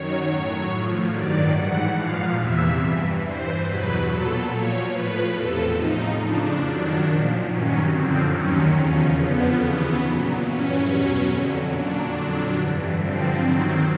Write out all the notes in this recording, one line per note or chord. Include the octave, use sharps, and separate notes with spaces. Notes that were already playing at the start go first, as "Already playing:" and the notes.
Already playing: F#2 D#3 F#3 C#5
A2 F#3
A2 F3
G2 D#3 F#3 D5
G#2 E3 F#5
A#2 F3 F5
E2 C3 E3 E5
G2 E3
G2 E3 C5
E2 B2 F#3 B4
A#2 F#3 A4
A#2 F3 C#5
A2 F3 B4
E2 C3 F3 A4
A2 F3 D#4
F2 C#3 F3 D4
F#2 D#3 F#3
A#2 F3
G2 D#3 F#3 C#4
F#2 D3 F3 C4
D#2 D#3 F#3 C#4
E2 C#3 F3 C#4
F2 D3 F3 B3
D#2 C#3 E3
A#2 F#3
G2 E3 C#4
E2 B2 F#3
F2 D3 F#3
A#2 F#3 D4
F2 D3 F#3
G2 E3
G2 D3 F3 C4
D#2 D#3 F#3